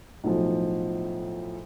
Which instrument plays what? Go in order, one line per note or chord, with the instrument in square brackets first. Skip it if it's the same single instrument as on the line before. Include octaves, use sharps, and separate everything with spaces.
[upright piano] B1 A2 F3